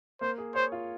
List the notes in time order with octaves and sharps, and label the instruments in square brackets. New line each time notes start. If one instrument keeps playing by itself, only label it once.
[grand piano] A#3 [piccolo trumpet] C5
[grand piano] G#4
[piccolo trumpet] C5 [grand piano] C#5
[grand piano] F4